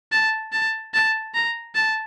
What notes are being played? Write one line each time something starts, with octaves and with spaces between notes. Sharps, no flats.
A5
A5
A5
A#5
A5